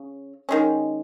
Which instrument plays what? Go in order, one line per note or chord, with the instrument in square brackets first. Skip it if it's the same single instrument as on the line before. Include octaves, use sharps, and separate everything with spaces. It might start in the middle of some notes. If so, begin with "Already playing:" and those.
Already playing: [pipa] C#3
D#3 G#3 C#4